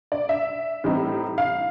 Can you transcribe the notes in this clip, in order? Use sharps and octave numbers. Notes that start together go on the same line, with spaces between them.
D5
E5
A2 E3 G3 C4 D#4
F5